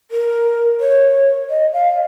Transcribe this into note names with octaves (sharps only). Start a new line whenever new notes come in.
A#4
C#5
D#5
F5